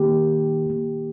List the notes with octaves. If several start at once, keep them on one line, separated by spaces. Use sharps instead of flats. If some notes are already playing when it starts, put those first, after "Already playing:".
Already playing: D#3 A#3 G4
D#3 A#3